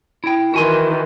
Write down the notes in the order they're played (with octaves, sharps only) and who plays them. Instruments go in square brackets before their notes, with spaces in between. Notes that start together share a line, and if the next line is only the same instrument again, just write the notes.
[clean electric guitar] E4 G5
[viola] D#3 E3 [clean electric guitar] F#4 G#5 C6